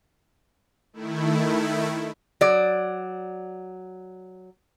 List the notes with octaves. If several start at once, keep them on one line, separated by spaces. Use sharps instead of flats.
D#3 A3 E4
F#3 D5